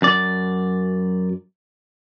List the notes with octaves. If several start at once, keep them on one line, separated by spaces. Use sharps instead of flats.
F#2 D5